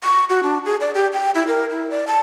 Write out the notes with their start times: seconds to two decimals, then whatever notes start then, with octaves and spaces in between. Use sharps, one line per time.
0.04 C#6
0.29 F#4
0.43 D4
0.66 G#4
0.80 D5
0.95 G4
1.13 G5
1.35 E4
1.47 A#4
1.70 E4
1.90 D5
2.07 A5